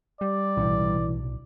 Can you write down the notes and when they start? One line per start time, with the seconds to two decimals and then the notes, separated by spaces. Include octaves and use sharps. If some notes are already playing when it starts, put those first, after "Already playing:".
0.21 G3 D5
0.57 B1 A2 C3 E3